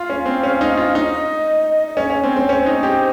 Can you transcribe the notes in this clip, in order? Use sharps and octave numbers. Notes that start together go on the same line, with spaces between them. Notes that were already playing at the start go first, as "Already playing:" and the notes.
Already playing: F4 F5
C#4
C4
C#4
D#4
F4
D#4 D#5
D#5
C#4 C#5
C#4
C4
C4
C#4 C5
D#4
G4